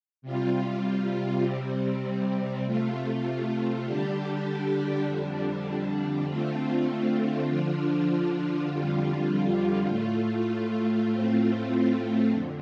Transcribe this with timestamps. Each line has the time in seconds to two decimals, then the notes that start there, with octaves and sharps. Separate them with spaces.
0.22 C3 G3 F4
1.43 C3 G3 C4
2.64 C3 A3 F4
3.85 D3 G3 D4 G4
5.05 F2 D3 G3 D4
6.26 D3 A3 C4 F4
7.47 D3 F3 D4 F4
8.68 F2 D3 G3 F4
9.88 A2 A3 F4
11.09 A2 A3 C4 F4
12.30 F2 D3